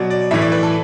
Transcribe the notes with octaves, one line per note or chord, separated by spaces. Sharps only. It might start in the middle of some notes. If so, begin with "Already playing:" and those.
Already playing: B2 F#3 D5
D5
A2 E3 E5
D5
B4
A4